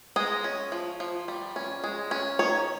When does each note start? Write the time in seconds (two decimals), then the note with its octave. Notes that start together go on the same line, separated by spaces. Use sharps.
0.16 G#3 D#5
0.44 C#4
0.72 F3
1.00 F3
1.28 G3
1.56 C#4
1.84 G#3
2.11 C#4
2.39 D#3 C#5